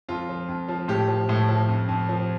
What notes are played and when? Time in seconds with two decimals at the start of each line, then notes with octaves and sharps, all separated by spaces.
0.08 F2 F4
0.29 F3
0.48 F2
0.68 F3
0.88 A2 G4
1.08 F3
1.29 A2
1.49 F3
1.68 F2
1.88 F2
2.09 F3